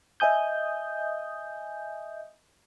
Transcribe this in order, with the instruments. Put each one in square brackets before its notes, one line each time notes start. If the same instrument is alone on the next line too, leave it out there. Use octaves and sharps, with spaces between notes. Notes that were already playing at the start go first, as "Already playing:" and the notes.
[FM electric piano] D#5 E5 G#5 D#6 G6